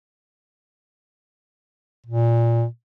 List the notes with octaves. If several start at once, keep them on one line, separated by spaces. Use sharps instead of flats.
A#2